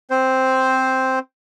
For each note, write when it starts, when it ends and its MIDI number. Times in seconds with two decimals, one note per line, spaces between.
0.10 1.19 60
0.10 1.19 72